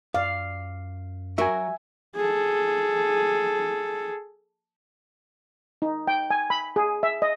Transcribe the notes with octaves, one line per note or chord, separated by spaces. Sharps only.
F#2 D5 F5
F#3 F#4 A#4 E5 G#5
G#4 A4
D#4
G5
G#5
B5
G#4
E5
D#5